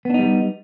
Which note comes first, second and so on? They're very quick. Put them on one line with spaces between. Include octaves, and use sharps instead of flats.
B3 D4 D#4 G3